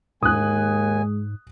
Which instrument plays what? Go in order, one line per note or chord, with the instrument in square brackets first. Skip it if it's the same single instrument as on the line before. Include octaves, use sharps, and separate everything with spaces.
[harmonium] D#2 G#5 [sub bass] G#2 [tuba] G#3 [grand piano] D#6 F#6